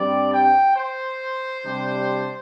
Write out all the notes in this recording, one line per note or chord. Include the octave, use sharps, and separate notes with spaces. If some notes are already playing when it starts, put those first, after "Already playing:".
Already playing: G2 G3 C4 D5
G5
C5
C3 G3 D4